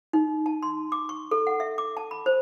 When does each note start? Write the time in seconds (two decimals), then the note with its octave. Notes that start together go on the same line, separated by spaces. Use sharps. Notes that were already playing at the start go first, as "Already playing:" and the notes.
0.13 D#4
0.46 A5
0.63 C6
0.92 D6
1.09 C#6
1.31 A4
1.47 F#5
1.60 E5
1.78 D6
1.97 A5
2.11 B5
2.26 C5